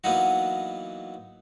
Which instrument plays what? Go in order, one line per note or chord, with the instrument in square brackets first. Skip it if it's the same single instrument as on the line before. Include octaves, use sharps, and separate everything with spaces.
[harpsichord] E3 F#3 A#3 B3 D#4 F#4